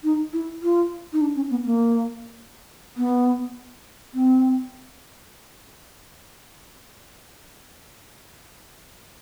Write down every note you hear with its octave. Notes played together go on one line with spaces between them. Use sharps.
D#4
E4
F4
D#4
D4
C#4
B3
A#3
B3
C4